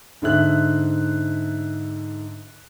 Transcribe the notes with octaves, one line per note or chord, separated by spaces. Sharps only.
G#2 D3 E5 F#6